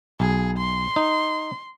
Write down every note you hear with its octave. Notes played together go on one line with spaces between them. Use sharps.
B1 G#4
C6
D#4